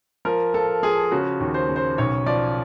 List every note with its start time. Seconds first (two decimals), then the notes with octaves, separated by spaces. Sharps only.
0.25 F3 A#4
0.54 F3 A4
0.83 F3 G#4
1.11 C#3 F#4
1.40 D#2
1.54 C5
1.69 C#3
1.76 C5
1.98 B1 C#5
2.26 F3 D5